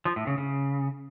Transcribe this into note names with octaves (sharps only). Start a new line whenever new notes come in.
F3
A2
C#3
C#3